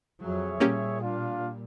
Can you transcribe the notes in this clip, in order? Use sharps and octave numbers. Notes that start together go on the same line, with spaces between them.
F2 F#3 G#4 C#5 E5
A#2 G3 A#3 C#4 G4
D4 F4 F5